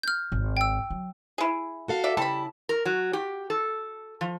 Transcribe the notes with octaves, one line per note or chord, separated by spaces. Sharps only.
F6 G6
G#1
G5 E6
F#3
E4 G#4
F#4 A4 F5
D5 E5
C#3 G3 E4 A5 B5
A#4
F#3
G4
A4
F3